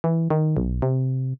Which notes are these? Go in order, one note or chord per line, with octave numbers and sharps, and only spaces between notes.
E3
D#3
B1
C3